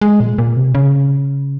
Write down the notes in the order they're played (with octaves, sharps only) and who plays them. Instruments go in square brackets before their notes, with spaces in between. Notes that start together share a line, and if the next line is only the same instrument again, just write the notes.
[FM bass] G#3
A#2
A#2
C3
C#3